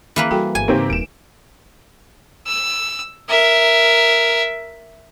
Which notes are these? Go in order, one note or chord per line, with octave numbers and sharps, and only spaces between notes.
E3 A#3 B4
G3 F#4 A4 G5
G1 G#5
G#2 C#3 A#3 C4 D#4 G4
D#1 D7 E7
E6
A#4 E5